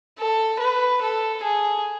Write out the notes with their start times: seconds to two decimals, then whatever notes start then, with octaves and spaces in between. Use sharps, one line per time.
0.19 A4
0.60 B4
1.02 A4
1.43 G#4